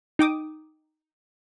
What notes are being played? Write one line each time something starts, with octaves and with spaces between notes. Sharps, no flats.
D#4 G5 D6 D#6